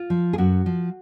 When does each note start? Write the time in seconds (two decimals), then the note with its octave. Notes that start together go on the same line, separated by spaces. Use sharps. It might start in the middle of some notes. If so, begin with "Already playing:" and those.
Already playing: F4
0.10 F3
0.33 G#4
0.38 F#2 F#4
0.66 F3